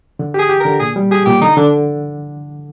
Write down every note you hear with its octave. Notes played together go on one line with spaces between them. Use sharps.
D3
G4 G#4
G4
D3 A#4
A#2 G#4
G3
G4 G#4
A#2 G4
D3 D#4
D3 D4